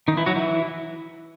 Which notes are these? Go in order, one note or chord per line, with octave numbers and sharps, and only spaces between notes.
D#3 D#4
E3 E4
F#3 F#4
E3 E4